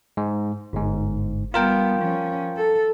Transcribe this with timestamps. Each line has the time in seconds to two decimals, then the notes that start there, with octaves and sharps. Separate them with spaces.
0.17 G#2
0.73 G1 G#2
1.54 G3 B3 F4 A#4 G5
1.99 F3 C#4
2.57 A4